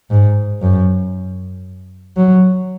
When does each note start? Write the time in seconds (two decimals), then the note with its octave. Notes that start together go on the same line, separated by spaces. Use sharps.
0.10 G#2
0.62 F#2
2.17 F#3